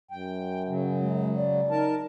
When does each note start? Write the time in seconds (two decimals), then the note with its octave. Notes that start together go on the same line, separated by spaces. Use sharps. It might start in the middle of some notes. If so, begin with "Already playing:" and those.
0.11 F#2 G5
0.68 C#3 F#3
1.00 G#3
1.36 D5
1.70 D#4 A#4 A5